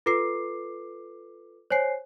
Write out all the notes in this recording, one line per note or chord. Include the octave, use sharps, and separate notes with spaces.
F4 A4 B4 D6 C7
C5 C#5 G#5 C7